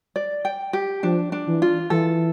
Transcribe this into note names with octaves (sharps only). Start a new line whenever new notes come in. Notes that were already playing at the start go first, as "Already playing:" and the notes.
D5
G5
G4
F3 D4
D4
E3
F4
E3 A4